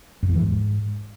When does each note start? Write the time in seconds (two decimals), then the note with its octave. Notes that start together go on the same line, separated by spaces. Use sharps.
0.23 F#2
0.29 E2
0.35 E3
0.42 G#2